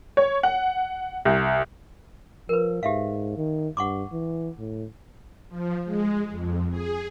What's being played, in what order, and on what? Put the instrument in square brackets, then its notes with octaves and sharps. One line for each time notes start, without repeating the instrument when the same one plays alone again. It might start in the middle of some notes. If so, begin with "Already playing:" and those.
[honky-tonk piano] C#5
F#5
C2
[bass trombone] F3 [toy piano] A#4 B4
[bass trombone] G#2 [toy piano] G4 E5 F5
[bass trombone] D#3
[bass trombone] G2 [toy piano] F#5 C#6 D6
[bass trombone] E3
A2
[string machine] F3
G#3
F2
G#4